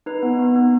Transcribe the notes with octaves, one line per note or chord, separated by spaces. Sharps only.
D#4 B4
B3
B3
B3